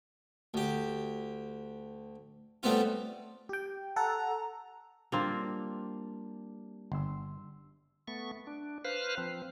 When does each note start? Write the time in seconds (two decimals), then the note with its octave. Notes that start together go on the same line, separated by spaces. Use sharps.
0.54 D2 G4
2.63 F#3 G3 A3 B3 C4 F4
3.49 G4 G5
3.96 A4 F#5 A#5
5.12 G3 A#3 C4 D4 F4
6.92 G1 C6 E6
8.08 A3 B3 C#6
8.47 D4
8.85 B4 C5 F5 F6 F#6
9.18 F3 C4